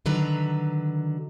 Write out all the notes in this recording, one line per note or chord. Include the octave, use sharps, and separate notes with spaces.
D3 D#3 F#3 B4 A#5